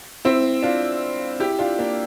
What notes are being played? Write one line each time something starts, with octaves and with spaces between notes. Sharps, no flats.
C4 E4
D4 F4
E4 G4
D4 F4
A#3 D4